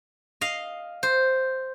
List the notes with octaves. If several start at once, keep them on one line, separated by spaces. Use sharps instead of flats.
D#5 F5
C5